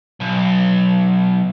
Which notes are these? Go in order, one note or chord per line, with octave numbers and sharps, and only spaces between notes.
B1